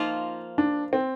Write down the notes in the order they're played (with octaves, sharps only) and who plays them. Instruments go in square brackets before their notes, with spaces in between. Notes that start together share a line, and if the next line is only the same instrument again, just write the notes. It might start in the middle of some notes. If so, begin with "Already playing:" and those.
Already playing: [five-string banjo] F3 A#3 F4 [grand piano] D#4
[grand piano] D4
C4